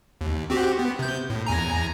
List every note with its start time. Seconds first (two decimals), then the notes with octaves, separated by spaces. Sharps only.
0.21 D#2
0.50 C4 F#4 G4
0.79 B3
0.99 C3 G6
1.30 A2
1.46 E2 G#5 A#5